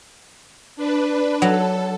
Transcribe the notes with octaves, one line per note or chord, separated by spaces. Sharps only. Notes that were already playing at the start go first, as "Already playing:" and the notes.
D4 B4
F#3 A4